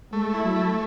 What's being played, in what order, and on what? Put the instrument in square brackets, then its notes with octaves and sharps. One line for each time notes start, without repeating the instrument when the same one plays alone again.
[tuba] G#3 [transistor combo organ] A3
[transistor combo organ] E4
[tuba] F#3
[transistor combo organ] A3